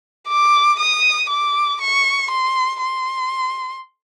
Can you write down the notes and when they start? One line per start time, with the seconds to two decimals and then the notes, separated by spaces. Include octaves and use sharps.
0.28 D6
0.79 D#6
1.30 D6
1.81 C#6
2.31 C6
2.82 C6